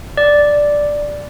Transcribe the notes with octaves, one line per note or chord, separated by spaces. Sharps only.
D5